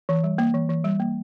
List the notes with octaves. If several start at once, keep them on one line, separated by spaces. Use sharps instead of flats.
E3
G3
A#3
E3
E3
G3
A#3